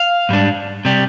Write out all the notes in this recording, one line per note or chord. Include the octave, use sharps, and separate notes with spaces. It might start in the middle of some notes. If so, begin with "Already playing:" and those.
Already playing: F5
G#2 G3 D4
C3 G3